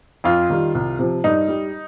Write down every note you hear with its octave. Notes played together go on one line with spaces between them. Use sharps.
F2 F4
D#3 G3
C2
C3 F3
G2 D#4
G3